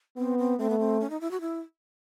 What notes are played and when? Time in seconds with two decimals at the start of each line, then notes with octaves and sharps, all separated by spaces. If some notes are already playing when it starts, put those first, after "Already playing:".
0.17 B3 C4
0.38 C4
0.59 A3 C4
0.69 B3
0.79 C4
1.00 C#4
1.10 D#4
1.21 E4
1.31 F#4
1.41 E4